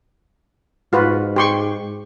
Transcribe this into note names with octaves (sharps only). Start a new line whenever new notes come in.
G#2 F4 F#4 B4
G4 C6 C#6